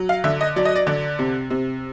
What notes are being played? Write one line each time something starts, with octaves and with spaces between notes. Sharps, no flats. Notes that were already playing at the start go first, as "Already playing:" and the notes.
Already playing: F#3
F5
D3 E5
D#5
F#3 D5
D#5
D5
D3 D5
C3
C3